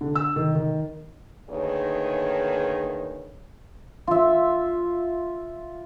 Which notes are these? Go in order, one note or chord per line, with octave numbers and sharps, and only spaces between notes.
D3
E6
D#3
D#3
D2 D#3 A#3 G#4 B4 C#5
F4 E5